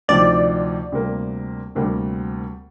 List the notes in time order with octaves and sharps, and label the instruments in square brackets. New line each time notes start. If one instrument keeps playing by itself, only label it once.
[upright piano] D2 C3 F3 C4 D#4 [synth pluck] D5
[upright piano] D2 C3 G3 A#3
D2 C3 G3 A#3